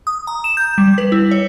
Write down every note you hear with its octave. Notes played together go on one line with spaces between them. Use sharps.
D#6
A#5
E7
G6
G3
B4
E4
C#5